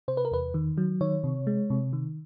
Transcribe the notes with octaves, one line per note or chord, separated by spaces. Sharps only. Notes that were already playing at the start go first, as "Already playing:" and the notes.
C3 C5
B4
A#4
E2 B4
D#3
F#3
D#3 C#5
C3
G#3
C3
D#3